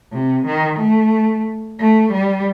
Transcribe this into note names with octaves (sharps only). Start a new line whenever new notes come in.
C3
D#3
A3
A3
G3